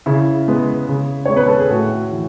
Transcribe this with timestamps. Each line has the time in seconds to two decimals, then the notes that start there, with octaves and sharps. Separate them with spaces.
0.06 C#3 E4
0.48 G#3 B3
0.89 C#3
1.26 G#3 C#5
1.34 B3 B4
1.48 A4
1.60 G#4
1.70 A2 F#4
2.12 E3